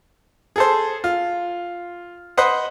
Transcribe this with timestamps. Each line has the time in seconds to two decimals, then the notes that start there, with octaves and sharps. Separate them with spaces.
0.56 G#4 A4 C5
1.04 F4
2.38 B4 C5 D#5 F#5